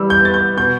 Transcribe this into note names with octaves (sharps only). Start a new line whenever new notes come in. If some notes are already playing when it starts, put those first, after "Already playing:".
Already playing: E3 G3 E6
G6
B3 A6
G6
B2 G6